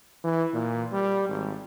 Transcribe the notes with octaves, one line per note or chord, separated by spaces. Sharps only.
E3
A#2
G3
G#1